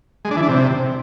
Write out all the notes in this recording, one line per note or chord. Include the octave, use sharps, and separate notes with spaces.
G#3
D4
E3
D4
C3